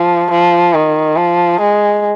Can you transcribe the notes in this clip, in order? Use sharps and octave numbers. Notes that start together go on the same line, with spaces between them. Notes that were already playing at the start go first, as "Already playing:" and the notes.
Already playing: F3
F3
D#3
F3
G#3